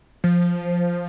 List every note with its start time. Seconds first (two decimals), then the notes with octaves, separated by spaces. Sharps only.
0.24 F3